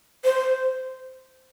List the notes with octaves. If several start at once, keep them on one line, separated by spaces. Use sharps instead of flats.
C5